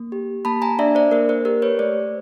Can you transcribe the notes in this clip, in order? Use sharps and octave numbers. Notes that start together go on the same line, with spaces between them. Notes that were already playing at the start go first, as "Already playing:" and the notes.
Already playing: A#3
G4
A#3 A5 B5
G#5 A#5
D4 D5 E5
C5 D5
A#3 A#4 C5
A#4 C5
G4 A#4 C5
B4 C#5
A3 C5 D5